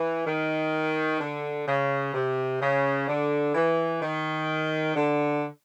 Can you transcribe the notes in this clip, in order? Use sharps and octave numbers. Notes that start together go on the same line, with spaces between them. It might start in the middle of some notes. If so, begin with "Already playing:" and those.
Already playing: E3
D#3
D3
C#3
C3
C#3
D3
E3
D#3
D3